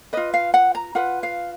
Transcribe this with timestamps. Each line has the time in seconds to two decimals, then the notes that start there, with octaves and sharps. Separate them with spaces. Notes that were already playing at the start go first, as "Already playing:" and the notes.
0.13 F4 B4 D#5
0.34 F5
0.54 F#5
0.75 A#5
0.95 F4 B4 F#5
1.23 F5